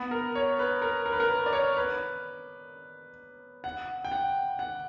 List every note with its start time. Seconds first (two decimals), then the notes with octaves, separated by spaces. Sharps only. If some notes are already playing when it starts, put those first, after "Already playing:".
Already playing: B3
0.11 A#4
0.35 C#5
0.59 B4
0.82 A#4
1.06 A#4
1.12 B4
1.20 A#4
1.30 B4
1.46 D5
1.53 C#5
1.77 B4
3.64 F#5
4.05 G5
4.12 F#5
4.59 F#5